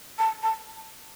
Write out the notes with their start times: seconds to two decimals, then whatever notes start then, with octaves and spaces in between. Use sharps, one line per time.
0.19 A5
0.43 A5